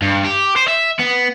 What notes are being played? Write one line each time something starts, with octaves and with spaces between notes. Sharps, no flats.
G2
G4
C5
E5
B3